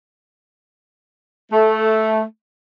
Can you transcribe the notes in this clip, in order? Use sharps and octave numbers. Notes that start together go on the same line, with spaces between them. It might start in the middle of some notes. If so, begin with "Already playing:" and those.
A3